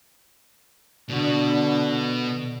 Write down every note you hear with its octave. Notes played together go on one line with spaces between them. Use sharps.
B2 D3 F#4